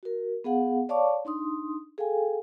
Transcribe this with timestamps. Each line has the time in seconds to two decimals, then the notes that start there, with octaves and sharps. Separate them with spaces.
0.03 F#4 A#4
0.44 B3 G#4 F5 F#5
0.89 C#5 D5 F5 A5 C#6 D6
1.25 D4 D#4 C6 D#6
1.98 G#4 A4 F5 G5 G#5